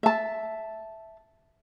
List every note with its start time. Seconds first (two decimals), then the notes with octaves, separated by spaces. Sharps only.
0.03 E5 A5